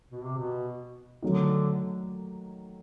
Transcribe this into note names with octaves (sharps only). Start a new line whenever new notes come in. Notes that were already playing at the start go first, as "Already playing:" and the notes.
B2
C3
B2
D3 D#3 F#3 A3